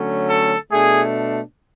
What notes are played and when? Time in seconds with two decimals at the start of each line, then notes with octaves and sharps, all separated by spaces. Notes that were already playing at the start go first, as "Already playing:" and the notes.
Already playing: D3 F#3 A3 C#4
0.28 A4
0.71 B2 A3 D4 G#4